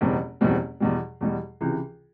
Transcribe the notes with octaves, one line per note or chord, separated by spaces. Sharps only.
F#1 E2 B2 G3 C4
F#1 E2 B2 G3 C4
E2 B2 G3
E2 B2 G3
C#2 C3 E3